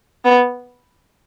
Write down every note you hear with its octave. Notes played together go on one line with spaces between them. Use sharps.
B3